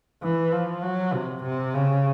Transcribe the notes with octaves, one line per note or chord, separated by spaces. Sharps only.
E3
F3
F#3
C3
C3
C#3